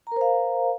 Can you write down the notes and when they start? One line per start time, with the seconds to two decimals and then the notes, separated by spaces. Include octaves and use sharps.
0.07 A#5
0.12 A#4
0.16 C5
0.21 F5